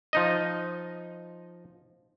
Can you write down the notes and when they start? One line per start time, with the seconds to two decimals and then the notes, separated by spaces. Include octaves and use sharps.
0.13 F3 D#4 D#5